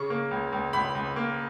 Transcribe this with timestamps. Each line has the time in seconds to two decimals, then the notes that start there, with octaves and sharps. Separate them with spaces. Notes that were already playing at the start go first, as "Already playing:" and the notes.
Already playing: C#3 C#6
0.10 A#3
0.31 C#2
0.53 C#2
0.73 C#2 B5
0.95 C#2
1.16 A#3